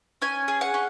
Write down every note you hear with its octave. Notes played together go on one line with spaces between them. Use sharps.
C#4 G#5
G#4
F#5
C#4